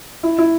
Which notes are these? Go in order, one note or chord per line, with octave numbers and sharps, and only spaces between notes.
E4
E4